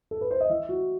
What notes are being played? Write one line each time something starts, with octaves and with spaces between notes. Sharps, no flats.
A4
B4
C5
D#5
E3 E5
F#4